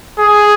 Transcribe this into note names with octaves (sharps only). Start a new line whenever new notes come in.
G#4